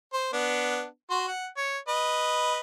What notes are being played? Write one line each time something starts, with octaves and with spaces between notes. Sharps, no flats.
C5
B3 D4
F#4 C6
F#5
C#5
B4 D#5